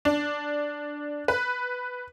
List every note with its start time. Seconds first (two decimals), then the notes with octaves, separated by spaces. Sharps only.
0.05 D4
1.28 B4